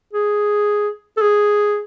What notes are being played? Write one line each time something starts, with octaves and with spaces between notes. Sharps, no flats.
G#4
A4
G#4